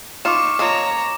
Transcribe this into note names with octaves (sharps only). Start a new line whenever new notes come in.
D#4 F4 C#6 D6 E7
F3 A#3 C#5 D#5 A#5